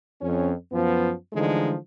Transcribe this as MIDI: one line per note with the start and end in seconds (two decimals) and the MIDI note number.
0.22 0.52 41
0.22 0.52 61
0.72 1.12 42
0.72 1.12 53
0.72 1.12 59
1.33 1.74 50
1.33 1.74 52
1.33 1.74 53
1.33 1.74 56
1.33 1.74 57
1.33 1.74 63